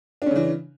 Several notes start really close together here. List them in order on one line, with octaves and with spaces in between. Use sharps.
D4 C#4 C#3 E3